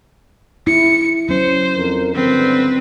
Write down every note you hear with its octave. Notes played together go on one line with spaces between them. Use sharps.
E4 C#7
F#3 C#4 C5
F2 A#4
C#2 G2 D3 C4 B4